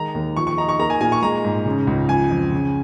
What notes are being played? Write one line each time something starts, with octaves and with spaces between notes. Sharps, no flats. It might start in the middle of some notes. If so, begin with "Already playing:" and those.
Already playing: D#3 G#3 A#5
D#2
F3 C#6
C#6
D#4 A#5
C#6
A#3 A#5
G#5
A#2 G#5
C#6
G#3 A#5
G#2
C#3
C#2
F3 G#5
F2
C#3